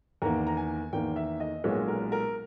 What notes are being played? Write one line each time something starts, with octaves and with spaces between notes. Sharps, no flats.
E2 D#3 A#3 A#5
A#5
G#5
E2 D#3 A#3 G5
E5
D#5
B1 A#2 G#3 B3 C#5
A#4
A#4